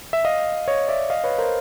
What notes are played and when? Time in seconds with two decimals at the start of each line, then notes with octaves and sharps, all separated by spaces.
0.13 E5
0.25 D#5 F5
0.68 C#5 D#5
0.88 D5 E5
1.10 D#5 F5
1.24 B4 C#5
1.38 A#4 C5